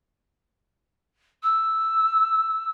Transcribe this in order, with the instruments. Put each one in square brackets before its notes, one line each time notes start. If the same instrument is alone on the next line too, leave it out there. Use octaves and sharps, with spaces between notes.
[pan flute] E6